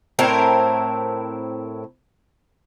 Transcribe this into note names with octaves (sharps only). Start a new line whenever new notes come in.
A2 C4 E4 A#4